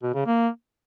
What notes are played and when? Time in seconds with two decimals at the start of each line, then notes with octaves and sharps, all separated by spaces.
0.03 B2
0.14 C#3
0.26 A#3